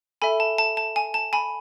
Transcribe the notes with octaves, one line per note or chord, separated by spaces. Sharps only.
A4 E5 G#5 B5
A5
A5
A5
G#5
A5
G#5 B5